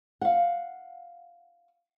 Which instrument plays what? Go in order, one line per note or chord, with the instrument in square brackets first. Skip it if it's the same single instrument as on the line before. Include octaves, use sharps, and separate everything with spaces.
[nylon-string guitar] F5 F#5